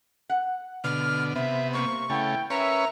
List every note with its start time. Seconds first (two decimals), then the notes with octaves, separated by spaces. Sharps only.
0.29 F#5
0.84 B2 D3 F6
1.35 C3 B3 E5
1.73 G3 A#3 C4 C#6
2.10 C#3 A3 B3 E4 G5
2.50 C#4 A#4 B4 C#5 E5 G#5 A#5